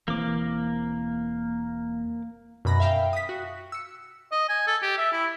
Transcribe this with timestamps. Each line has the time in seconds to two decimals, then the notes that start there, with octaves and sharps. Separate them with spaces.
0.08 E1 E3 A#3 C4 D6
2.65 F#2 B2 B5 A#6
2.80 E5 F5 G5
3.13 D#6 B6
3.29 F#4
3.72 E6 C#7
4.32 D#5
4.49 G#5
4.67 A4
4.83 G4
4.98 E5
5.13 E4